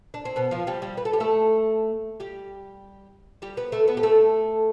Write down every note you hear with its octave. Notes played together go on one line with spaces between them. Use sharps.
D4
C4
B2 B3
F3 F4
G3 G4
G3 G4
B4
A4
G4
A3 A4
G3 G4
G3 G4
B3 B4
A3 A4
B3 B4
G4
A3 A4